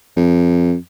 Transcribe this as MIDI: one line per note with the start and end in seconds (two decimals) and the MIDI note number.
0.17 0.76 41